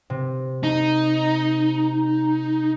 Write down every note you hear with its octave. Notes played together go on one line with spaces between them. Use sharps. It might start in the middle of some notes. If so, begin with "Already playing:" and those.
C3
D#4